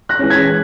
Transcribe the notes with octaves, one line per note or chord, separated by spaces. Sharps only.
F#6 A#6
E3 G#3 C#4
G#6 B6